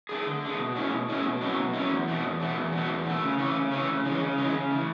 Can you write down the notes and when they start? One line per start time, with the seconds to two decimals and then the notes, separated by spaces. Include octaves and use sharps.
0.09 A3 D4 G#4
0.26 D3
0.42 A3 D4 G#4
0.59 B2
0.75 A3 C#4 E4 G#4
0.91 B2
1.09 A3 C#4 E4 G#4
1.25 B2
1.41 F#3 A3 C#4 E4
1.57 B2
1.74 F#3 A3 C#4 E4
1.90 E2
2.08 B2 A3
2.24 E2
2.40 B2 A3
2.56 E2
2.72 B2 A3
2.89 E2
3.05 B2 A3
3.22 C#3
3.38 E3 A3 C#4
3.56 C#3
3.71 E3 A3 C#4
3.89 C#3
4.05 E3 G#3 C#4
4.21 C#3
4.38 E3 G#3 C#4
4.54 C#3
4.71 E3 A3